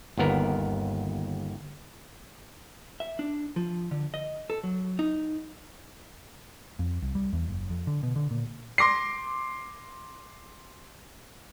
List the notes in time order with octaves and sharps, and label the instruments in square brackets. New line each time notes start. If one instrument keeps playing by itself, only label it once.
[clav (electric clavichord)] G1 D#2 B3 A#4
[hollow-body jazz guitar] E5
D4
F3
D3
D#5
A4
F#3
D#4
[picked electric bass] F2
C2
G3
E2
F#1
F2
D3
B2
D3
A#2
[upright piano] C6 D6 A#6 C7